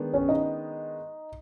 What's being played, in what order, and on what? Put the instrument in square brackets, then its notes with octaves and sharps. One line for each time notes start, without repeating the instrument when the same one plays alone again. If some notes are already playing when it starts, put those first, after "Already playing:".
Already playing: [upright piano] D#3 G#3 B3 D4
[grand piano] C#4 C#5
D#4 D#5